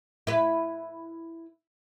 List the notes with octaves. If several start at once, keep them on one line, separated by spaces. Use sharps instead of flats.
E4 B4